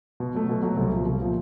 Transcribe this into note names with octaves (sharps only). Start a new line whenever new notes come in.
B2
F#3 A3
B2
F#3 A3
C2
A#2 F3
C2
A#2 F3